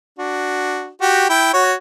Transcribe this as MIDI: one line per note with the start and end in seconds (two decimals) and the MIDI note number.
0.19 0.88 62
0.19 0.88 66
1.01 1.28 66
1.01 1.28 67
1.29 1.51 64
1.29 1.51 79
1.54 1.73 66
1.54 1.73 73